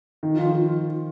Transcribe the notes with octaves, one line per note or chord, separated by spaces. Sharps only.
D#3 D#4
F3
F4
F3
F3 F4